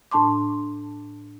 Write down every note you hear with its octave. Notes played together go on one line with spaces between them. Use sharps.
A2 D4 A5 C6 D6